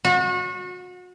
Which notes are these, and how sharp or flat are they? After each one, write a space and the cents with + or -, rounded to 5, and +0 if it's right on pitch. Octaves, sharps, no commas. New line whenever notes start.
F#4 -35